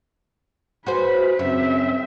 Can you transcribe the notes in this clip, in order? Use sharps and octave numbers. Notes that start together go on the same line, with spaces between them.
F#4 G#4 B4 C5
F#2 C#3 C4 E5